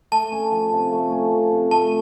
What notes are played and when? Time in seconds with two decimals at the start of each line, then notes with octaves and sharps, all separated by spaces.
0.12 A3 A5
0.32 C#4
0.51 F3
0.72 C3
0.92 A3
1.11 C#4
1.32 F3
1.52 C3
1.71 A3 A5